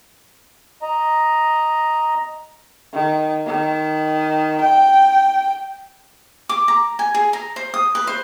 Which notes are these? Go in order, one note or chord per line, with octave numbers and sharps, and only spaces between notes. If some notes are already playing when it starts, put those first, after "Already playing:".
D#5 A#5
D#3
D#3
G5
D6
A#5
G#5
G#4
A#5
C5
D#6
B4
C5